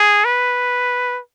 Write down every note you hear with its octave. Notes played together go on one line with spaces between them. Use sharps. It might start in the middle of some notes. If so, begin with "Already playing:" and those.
Already playing: G#4
B4